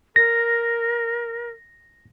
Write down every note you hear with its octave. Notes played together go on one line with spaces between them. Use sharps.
A#4 A#6